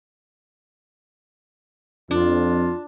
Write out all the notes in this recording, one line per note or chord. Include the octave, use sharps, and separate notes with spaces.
F2 D4 F4